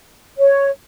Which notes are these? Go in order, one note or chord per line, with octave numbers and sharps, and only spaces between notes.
C#5